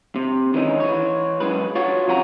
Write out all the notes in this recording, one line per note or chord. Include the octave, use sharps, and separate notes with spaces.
C3
D#3 E3 G#3 C#4 D#4
E3 C#5
F#2 G#3 B4
F4 F#4 C#5
F2 C3 C#4 F#4 A#5